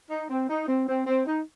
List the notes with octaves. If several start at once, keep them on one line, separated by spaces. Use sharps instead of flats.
D#4
C4
D#4
C4
C4
C4
D#4